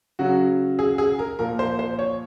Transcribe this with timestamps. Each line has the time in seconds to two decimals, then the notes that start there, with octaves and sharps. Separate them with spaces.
0.19 C#3 F#3 F#4
0.79 G#4
0.98 G#4
1.19 A#4
1.39 A#2 F3 A#4
1.59 C5
1.79 C5
1.99 C#5